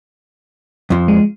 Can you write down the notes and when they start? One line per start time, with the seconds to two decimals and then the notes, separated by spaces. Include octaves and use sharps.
0.90 F2 F3
1.08 G#3